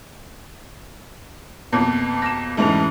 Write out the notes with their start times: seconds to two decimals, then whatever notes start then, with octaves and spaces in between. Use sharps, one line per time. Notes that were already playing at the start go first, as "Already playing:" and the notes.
1.72 F2 B2 A#3
2.22 A#6 E7
2.57 F1 G#2 C#3 E3 A3 F7